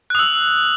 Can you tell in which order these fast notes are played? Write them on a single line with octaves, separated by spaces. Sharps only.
F#6 D#6 E6